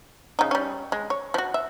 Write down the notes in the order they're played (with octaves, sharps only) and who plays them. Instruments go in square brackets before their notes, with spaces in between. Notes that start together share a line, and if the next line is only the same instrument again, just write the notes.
[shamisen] C#3 D#4
G3 C#4
G#3
C#5
F3 F#4
E5